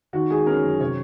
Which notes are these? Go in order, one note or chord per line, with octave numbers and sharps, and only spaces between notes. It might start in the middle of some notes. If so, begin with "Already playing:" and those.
D#3 F#4
G#3 G#4
C#4 A#4
F#2
C3 C#5